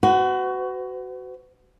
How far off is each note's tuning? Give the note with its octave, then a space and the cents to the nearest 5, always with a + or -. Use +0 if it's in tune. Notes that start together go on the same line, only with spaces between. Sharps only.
F#4 +15 B4 +40